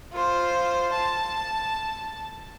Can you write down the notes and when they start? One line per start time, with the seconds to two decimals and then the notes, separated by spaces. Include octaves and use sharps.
0.13 F4 C5
0.93 A5